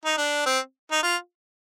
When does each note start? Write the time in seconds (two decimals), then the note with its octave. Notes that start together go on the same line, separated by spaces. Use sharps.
0.05 D#4
0.17 D4
0.46 C4
0.92 D#4
1.03 F4